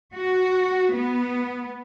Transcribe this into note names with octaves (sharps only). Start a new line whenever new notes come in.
F#4
B3